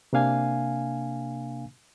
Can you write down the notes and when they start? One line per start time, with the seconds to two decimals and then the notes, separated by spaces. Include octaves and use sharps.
0.13 C3 A#3 D4 F5 G#5